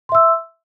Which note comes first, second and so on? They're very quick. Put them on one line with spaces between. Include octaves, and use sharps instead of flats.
C6 E5 E6